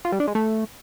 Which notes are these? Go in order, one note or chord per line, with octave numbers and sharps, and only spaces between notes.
F4
G3
D4
G#3
A3